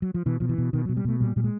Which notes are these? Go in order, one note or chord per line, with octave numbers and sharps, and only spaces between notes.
F#3
F3
B2 E3
B2 F3
E3
B2
B2 D#3
B2 F#3
G3
B2 A3
A#2 G3
A#2 G3
G#3